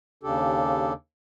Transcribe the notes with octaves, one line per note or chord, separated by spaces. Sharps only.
D#2 C#3 D4 G4 A4